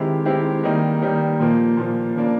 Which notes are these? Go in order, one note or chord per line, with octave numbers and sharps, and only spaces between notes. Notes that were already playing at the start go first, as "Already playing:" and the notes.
Already playing: D#3 G#3 C4 E4 G4
D#3 G#3 C4 E4 G4
D#3 G3 A#3 D#4
D#3 G3 A#3 D#4
A#2 F3 A#3
A#2 F3 A#3
C#3 F3 A#3 D4